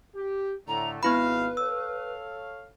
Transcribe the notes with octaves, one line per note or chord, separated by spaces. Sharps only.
G4
A2 D3 A3 A#5
G#1 B3 E4 B4 F5 B5
A4 C#5 F5 E6